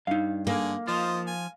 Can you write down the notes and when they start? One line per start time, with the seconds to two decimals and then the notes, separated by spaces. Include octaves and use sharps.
0.07 G2 D#4 F5
0.47 D3 A#3 G#4
0.87 F3 F4 C5 D#5
1.27 G#5